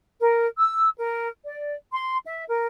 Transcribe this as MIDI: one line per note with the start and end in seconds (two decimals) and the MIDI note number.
0.21 0.47 70
0.58 0.89 88
0.98 1.28 70
1.44 1.75 74
1.93 2.17 84
2.27 2.44 76
2.49 2.67 70